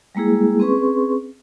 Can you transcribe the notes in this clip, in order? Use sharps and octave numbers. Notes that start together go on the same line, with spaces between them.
G3 G#3 A#3 E4 G#4
C4 C#4 G#4 B4 C6 C#6